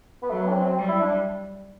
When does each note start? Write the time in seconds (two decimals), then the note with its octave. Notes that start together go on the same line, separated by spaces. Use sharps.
0.22 B3
0.29 F#3 A3
0.41 B3
0.47 D4
0.53 C4
0.66 C4
0.77 G3
0.89 E4
1.01 D4